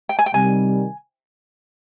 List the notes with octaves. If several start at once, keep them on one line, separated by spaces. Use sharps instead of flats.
G5
G#5
G5
C3 D#3 G3 G#5